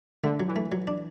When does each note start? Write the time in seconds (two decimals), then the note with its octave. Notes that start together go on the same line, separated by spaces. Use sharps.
0.23 D3 A3
0.40 F#3
0.48 E3
0.56 A3
0.72 F#3
0.87 D4